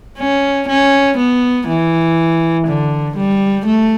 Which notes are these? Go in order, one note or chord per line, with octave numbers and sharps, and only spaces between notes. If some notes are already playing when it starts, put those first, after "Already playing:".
C#4
C#4
B3
E3
D3
G3
A3